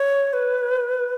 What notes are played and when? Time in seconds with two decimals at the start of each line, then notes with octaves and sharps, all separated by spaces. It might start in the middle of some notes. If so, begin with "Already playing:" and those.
Already playing: C#5
0.33 B4